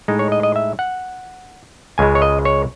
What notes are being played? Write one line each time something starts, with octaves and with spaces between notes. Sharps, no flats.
A2 G#3 D#4
C#5
D#5
D#5
E5
F#5
C#2 C#3 G#3 G#5
C#5
D#5
C#5